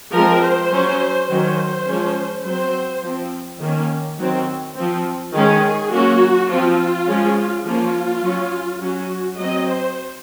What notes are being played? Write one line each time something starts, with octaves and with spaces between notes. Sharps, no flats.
F3 G#3 C4 A#4
C5
F#3 C#4
D#3 F#3 C#4 C5
F3 G#3 C#4
F#3 C4 C5
F3 C4
D#3 A#3 C#4
D#3 F#3 C4
F3 C4
D#3 G#3 C#4 G#4
F#3 A#3 C#4 F#4
F3 C4 F4
F3 G#3 C#4
F3 A#3 C#4 F4
F#3 C#4
F#3 C#4 F#4
F#3 C4 D#5
C5